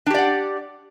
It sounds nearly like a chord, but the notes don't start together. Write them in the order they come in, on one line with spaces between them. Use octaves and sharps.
D4 G4 D5 F#5